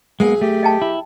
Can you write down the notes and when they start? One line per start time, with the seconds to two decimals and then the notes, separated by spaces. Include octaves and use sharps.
0.20 B1 G#3 A#3 B3 G#4
0.41 A3 G4
0.63 D#5 G5 A5
0.82 E4